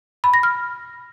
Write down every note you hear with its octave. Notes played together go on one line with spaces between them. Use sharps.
B5
A#6
F6